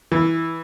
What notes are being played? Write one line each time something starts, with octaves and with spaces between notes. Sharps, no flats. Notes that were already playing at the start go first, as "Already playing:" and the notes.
E3